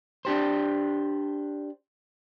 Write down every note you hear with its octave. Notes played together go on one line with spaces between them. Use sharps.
D4 G4 C5